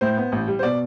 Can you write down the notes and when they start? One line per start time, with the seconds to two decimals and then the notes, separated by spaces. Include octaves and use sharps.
0.01 A2 C5
0.17 B3
0.32 A1
0.48 G3
0.59 C5
0.63 B2 D5